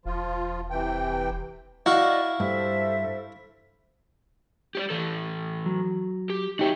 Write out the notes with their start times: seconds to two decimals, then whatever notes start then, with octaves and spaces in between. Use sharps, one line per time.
0.05 E1 F3 F4
0.70 C3 E3 G5
1.86 E4 F#4 D5 D#5 F5 C#6
2.40 G2 A4 C5 E5
4.75 G4 C#5 D5
4.90 E3 A4
5.66 F#3
6.30 G4
6.59 D#4 F#4 G4 C#5 E5